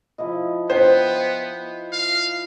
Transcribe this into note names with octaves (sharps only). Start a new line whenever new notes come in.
F3 E4 D#5
B3 C5 G5
F5